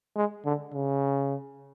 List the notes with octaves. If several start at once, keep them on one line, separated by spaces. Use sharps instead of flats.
G#3
D3
C#3